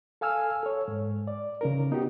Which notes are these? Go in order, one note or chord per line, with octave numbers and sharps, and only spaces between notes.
A4 F5 G#5 E6 F6
A4 C#5
G#2
D5
C#3 D#4 A#4
B3 D#4 F#4 G4